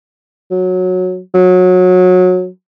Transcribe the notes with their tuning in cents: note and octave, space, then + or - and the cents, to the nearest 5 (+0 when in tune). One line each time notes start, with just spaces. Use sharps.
F#3 -15
F#3 -20